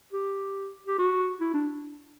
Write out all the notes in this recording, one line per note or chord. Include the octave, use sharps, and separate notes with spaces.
G4
G4
F#4
E4
D4